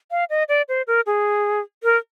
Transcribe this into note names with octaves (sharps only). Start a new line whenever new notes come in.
F5
D#5
D5
C5
A#4
G#4
A#4